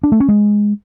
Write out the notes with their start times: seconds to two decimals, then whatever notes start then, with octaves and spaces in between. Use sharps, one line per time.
0.03 D4
0.12 A3
0.20 C#4
0.28 G#3